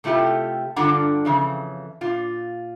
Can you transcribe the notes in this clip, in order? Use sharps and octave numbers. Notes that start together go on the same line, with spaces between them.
C3 A3 E4 F4 G4
G2 D3 D4 F4 F#5 A#5
F2 C#3 E3
A#2 F4